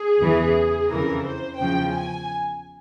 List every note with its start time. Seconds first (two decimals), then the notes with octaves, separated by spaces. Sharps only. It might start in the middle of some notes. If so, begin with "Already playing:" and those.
Already playing: G#4
0.19 E2 C#3 E3
0.88 F2 C#3 E3 A#4
1.24 C5
1.58 E2 C#3 F3 G5
1.94 G#5